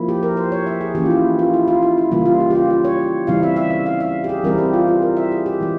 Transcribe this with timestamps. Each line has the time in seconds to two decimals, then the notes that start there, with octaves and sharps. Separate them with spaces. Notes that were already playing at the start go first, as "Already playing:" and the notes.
Already playing: F3 A#3 E4
0.09 G4
0.23 A#4
0.37 C5
0.52 C#5
0.67 E5
0.81 G#4
0.95 E3 A#3 C#4 G4
1.05 F4
1.10 E4
1.39 F4
1.54 E4
1.68 F4
1.83 E4
1.98 E4
2.11 C#3 E3 G3 A#3 F4
2.26 F4
2.40 G4
2.50 G4
2.55 F4
2.70 F4
2.84 C#5
3.27 C#3 E3 G3 C4 E4 F5
3.43 E5
3.56 E5
3.71 E5
3.86 F5
4.00 E5
4.24 G4
4.29 G#4
4.44 E3 G3 C4 E4 A#4
4.58 G4
4.74 F4
4.88 F4
5.02 A#4
5.17 E5
5.31 G#4
5.46 G4
5.61 E3 G#3